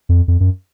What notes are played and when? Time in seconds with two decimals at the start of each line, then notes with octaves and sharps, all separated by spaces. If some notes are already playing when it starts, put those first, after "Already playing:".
0.09 F2
0.28 F2
0.40 F#2